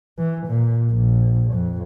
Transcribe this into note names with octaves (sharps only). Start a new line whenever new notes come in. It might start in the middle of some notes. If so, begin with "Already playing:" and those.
E3
A#2
A#1
F2